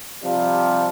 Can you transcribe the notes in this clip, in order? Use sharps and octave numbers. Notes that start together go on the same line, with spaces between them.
C3 F3 G3